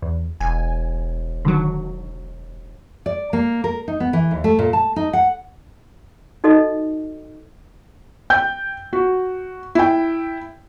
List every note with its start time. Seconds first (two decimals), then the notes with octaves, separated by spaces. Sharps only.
0.02 E2
0.40 E1 G#5
1.45 D3 D#3 F#3
3.06 D5
3.33 A#3
3.64 A#4
3.88 D#4
4.00 B3
4.13 E3
4.31 D#2
4.44 A3
4.59 A#2
4.73 A5
4.96 D#4
5.13 F#5
6.44 D#4 F#4 A4 D#5
8.30 G5 G6
8.93 F#4
9.75 E4 G5